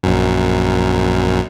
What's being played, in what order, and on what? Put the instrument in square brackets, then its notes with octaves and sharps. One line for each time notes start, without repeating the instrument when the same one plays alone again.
[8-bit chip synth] A#1 F#2